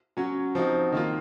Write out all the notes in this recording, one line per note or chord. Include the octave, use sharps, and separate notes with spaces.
F#3 C#4 F#4
F3 C4 D#4 F#4
D#3 A#3 F4